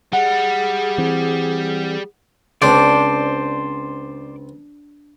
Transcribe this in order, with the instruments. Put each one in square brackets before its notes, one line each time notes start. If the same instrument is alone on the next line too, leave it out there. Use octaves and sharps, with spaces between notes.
[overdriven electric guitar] G3 [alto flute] G#4 [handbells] F#5
[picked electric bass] E3 C4
[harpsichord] C#2 C4 [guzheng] D4 [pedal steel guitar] C5 D5